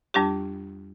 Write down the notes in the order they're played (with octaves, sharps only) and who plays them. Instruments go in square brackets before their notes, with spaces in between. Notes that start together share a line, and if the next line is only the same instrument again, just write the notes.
[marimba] F2 G3 D4 G4